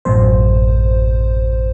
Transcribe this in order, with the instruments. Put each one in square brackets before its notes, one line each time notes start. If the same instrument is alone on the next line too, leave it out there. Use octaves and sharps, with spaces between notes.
[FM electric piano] A1 F#2 B2 C5